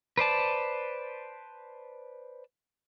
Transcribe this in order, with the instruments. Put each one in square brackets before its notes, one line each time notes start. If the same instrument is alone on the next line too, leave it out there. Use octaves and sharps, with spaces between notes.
[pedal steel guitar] B4 C5 D5 A5